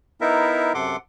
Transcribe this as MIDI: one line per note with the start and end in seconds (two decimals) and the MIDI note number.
0.21 0.73 59
0.21 0.73 63
0.21 0.73 64
0.21 0.73 70
0.21 0.73 76
0.75 0.97 42
0.75 0.97 48
0.75 0.97 69
0.75 0.97 78
0.75 0.97 84
0.75 0.97 86